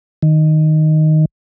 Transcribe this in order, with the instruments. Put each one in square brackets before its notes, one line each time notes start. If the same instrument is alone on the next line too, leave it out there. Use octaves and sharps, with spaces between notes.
[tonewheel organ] D#3